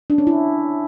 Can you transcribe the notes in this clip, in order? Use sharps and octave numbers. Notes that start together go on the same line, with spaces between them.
D4
C#4
E4